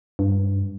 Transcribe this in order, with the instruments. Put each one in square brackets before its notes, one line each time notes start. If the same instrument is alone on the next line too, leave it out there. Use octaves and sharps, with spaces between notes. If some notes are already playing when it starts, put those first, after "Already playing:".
[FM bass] G2